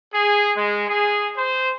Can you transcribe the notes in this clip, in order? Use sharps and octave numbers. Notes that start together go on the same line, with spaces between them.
G#4
G#3
G#4
C5